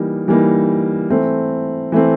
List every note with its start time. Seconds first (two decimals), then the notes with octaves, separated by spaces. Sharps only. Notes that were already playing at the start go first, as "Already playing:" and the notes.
Already playing: E3 G3 A#3 D#4
0.28 E3 G3 A#3 D#4
1.10 E3 A3 C4
1.92 E3 A3 C4